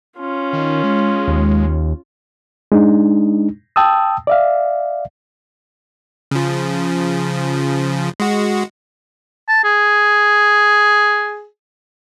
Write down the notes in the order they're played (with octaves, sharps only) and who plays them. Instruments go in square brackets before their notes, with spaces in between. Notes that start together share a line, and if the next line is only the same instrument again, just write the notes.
[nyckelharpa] C#4 F4
[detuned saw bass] D#3
G#3
[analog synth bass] D#2
[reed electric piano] G#3 D4 D#4
G5 A5 D#6 E6
D5 E5 F5
[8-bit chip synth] C#3 F3
G#3 F#4
[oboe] A5
G#4